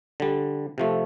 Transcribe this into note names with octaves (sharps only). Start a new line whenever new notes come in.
D3 G3
C3 F3 A3